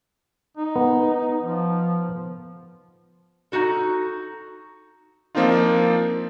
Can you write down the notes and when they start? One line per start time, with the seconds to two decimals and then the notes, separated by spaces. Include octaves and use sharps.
0.57 D#4
0.76 B3
1.42 F3
3.52 D#4 F4 F#4 A4
5.35 F3 A#3 C4 D4 D#4 F4